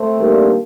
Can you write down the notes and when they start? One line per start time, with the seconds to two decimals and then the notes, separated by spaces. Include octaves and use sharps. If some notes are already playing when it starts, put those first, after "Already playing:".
Already playing: A3 C4
0.16 D#3 G3 A#3 D4 G4